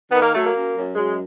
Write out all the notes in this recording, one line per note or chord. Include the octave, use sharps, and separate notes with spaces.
D#3 B3
A#3
F#3 A3
A#3
F#2
F#2
F#2 G#3